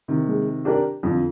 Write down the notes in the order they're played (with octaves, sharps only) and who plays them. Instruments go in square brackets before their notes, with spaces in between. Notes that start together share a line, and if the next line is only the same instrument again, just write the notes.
[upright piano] C3 D#3
[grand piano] G#3
D4 G4 A#4 D5
[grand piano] F2 [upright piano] D3